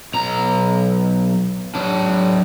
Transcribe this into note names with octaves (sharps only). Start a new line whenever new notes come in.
B1 A#5
F#3 D4